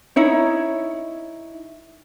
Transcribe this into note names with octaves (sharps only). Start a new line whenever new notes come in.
D#4 E4 C#5